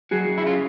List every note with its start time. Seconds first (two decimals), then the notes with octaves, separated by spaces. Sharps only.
0.11 F#3 F#4 G#4
0.28 F#2
0.38 E4
0.46 C#3 F4